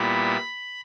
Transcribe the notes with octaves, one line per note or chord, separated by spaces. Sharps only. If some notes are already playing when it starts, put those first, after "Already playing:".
Already playing: A#2 G3 B3 E4 B5